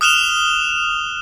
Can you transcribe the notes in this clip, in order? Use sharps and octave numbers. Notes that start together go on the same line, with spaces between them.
D#6 F6 F#6 E7 F7 G7